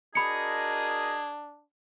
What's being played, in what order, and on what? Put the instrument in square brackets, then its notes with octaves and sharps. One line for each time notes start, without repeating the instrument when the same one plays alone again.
[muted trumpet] D4 [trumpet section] F#4 A#4 D#5 [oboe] G#4 [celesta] B5 C#7